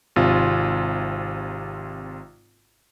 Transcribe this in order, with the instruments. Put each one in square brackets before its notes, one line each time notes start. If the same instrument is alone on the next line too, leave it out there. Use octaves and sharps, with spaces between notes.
[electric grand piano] G#1 C3 F4